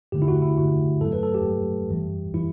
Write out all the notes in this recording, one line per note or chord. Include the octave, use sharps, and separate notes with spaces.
G2 D3 A3 G4
E4
F#4
E4
G2 D3 A3 F#4
G2 F#3 A3 A4
B4
A4
G4
G2 F#3 A3
F#2 E3 G3
E3 G3 E4